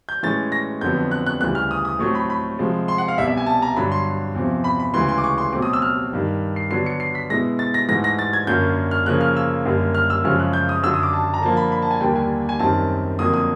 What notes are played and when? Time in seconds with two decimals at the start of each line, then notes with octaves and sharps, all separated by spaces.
0.09 G6
0.23 A2 E3 G#3 C#4 A6
0.52 A#6
0.81 F2 D3 F#3 B3 G6
1.11 F#6
1.26 F#6
1.41 D2 C#3 E3 G3 F#6
1.55 F6
1.71 D#6
1.85 D#6
1.99 A2 F#3 A3 C4 C#6
2.15 B5
2.30 B5
2.59 C3 F3 G#3
2.88 C6
2.98 F#5
3.08 F5
3.17 C2 B2 G3 E5
3.27 E5
3.37 G#5
3.46 A5
3.62 A#5
3.76 G2 D3 F#3 B5
3.92 C6
4.35 E2 C3 F3
4.64 B5
4.80 B5
4.94 D2 C#3 E3 G#3 C6
5.08 C6
5.18 D6
5.24 C#6
5.38 C6
5.53 B2 F#3 A3 C4 D6
5.62 D#6
5.73 E6
5.82 F6
6.13 G2 D#3 G3
6.56 C7
6.71 D3 F#3 B3 D4 C7
6.86 C#7
7.00 C7
7.15 B6
7.30 B2 G#3 B3 E4 A#6
7.59 A6
7.74 A#6
7.89 G#2 E3 A3 A#6
8.04 A#6
8.19 A6
8.33 G#6
8.47 F#2 D3 F#3 A#3 C#4 G6
8.91 F6
9.06 C#3 F3 A#3 C#4 F#6
9.21 F6
9.36 E6
9.65 F#2 D3 G3 A#3
9.95 F6
10.10 E6
10.24 F#2 C#3 F3 G#3 C#4 F6
10.39 F#6
10.53 G6
10.69 D#6
10.83 F#2 D3 F#3 E6
10.94 D#6
11.03 D6
11.13 A5
11.34 A#5
11.42 D3 F3 A#3 A5
11.57 B5
11.72 B5
11.82 A5
11.91 G#5
12.01 D#2 D3 G3 A#3 D4 G5
12.15 G#5
12.49 G#5
12.59 F#2 D#3 G3 C4 A5
13.19 F2 D3 F#3 A#3 D#6
13.34 D#6